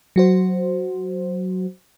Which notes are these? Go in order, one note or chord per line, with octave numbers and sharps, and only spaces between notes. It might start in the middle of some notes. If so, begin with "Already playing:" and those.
F#3 F#4 C5